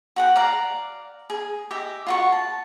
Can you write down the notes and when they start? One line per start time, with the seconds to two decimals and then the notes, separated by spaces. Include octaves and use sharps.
0.16 F#4 F#5 G5
0.36 D5 F5 A#5
1.30 G#4
1.71 G4 D#5 E5
2.07 F4 F#4 C#6
2.32 A5